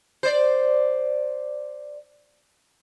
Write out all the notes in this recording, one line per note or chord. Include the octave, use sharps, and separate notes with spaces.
C5 D5